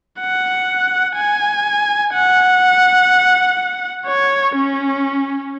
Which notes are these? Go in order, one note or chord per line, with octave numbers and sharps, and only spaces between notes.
F#5
G#5
F#5
C#5
C#4